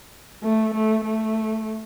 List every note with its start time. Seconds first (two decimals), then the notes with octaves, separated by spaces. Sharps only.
0.43 A3
0.74 A3
1.04 A3